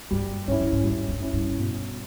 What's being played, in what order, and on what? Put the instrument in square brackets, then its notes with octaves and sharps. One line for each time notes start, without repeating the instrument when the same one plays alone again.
[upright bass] G2 [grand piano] G3
[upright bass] G#2 [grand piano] C#4 E4
[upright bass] G2
G#2
[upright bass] G#2 [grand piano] G3
[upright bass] G2
[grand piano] C#4 E4
[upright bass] G2
[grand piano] B2